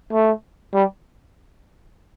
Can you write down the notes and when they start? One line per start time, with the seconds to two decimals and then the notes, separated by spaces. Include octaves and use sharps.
0.13 A3
0.74 G3